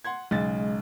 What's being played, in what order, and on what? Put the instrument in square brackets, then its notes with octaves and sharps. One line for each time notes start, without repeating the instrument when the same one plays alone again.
[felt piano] F#5 C6 G#6
[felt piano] B1 C#3 A6 [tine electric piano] G#3